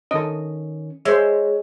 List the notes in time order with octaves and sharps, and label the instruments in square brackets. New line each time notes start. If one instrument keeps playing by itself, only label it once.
[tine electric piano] D#3 C#4 [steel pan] A4 D#5
[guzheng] G#3 [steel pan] C5 E5 [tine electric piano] C#5